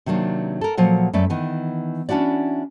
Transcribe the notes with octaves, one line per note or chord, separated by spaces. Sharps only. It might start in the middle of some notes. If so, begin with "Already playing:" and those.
C3 D#3 F#3 A#3 D4
A4 A#4
A#2 F3 F#3 F#5
F#2 A3 B4 D5
D#3 E3 B3
C#4 D4 E4 F#4 D5